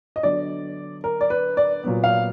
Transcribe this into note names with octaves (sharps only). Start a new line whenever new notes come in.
D#5
D3 F#3 B3 D5
A#4
D5
B4
D5
A#2 F#3 B3
F5